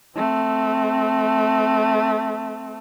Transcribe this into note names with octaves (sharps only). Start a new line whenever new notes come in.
A3 C4